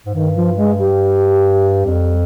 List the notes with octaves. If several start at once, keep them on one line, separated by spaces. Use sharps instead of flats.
G#2
G2 D#3
F3
G#3
G3
F2